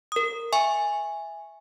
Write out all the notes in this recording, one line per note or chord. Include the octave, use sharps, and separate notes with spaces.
A#4 D#6
E5 G#5 C#6